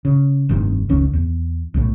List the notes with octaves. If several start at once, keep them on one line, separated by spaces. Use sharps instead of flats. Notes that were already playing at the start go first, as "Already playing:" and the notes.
C#3
F1 G2 C3 D#3
F1 C#2 D#3 C#4
E2
B1 A2